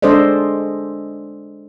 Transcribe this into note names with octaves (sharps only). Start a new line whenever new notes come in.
G#3 D4 A4 C5 D5 D#5